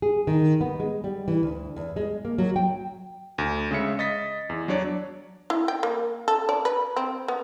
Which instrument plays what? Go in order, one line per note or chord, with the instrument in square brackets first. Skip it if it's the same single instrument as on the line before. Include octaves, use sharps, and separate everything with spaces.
[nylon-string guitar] G#4
D#3
B3
G#3
G3
E3
D2
E2
G#3
A#3
F#3
G5
[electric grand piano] D2
C#3 G#3 E5 C#7
D#5 A6 B6
E2
F#3 D4 C#5 D5
[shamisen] E4
G5
A#3
A4
D5
B4
C4
B3